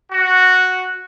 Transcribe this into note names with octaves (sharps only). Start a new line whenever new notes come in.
F#4